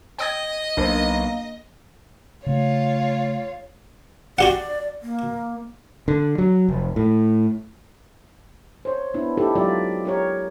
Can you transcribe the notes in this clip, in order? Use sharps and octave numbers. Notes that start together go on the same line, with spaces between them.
D#5 G5 D#6 G#6
B1 A#3 D4 A#4 C5
C#3 A3 F4 C#5
F#4 G4 D5 F#5
A#3
D3
F#3
F1
A2
C5 C#5
B3 D4 E4
D#4 E4 G4 A4
F#3 G#3 F4 G4 D5 E5
G4 A#4 C#5